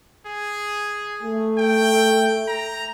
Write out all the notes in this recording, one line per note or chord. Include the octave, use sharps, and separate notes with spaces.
G#4
A3
G5
A#5